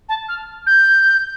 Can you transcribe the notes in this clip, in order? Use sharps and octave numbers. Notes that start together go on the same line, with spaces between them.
A5
F6
G6